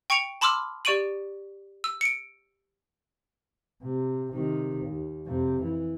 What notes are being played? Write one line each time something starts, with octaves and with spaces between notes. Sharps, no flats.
G5 C#6 C#7 D7 F7
A5 B5 C6 D6 E6 F6
G4 D5 C#6 D7 D#7 F#7
E6
C#7 D7
C3
C3 D#3
D#2
F2 C3
E3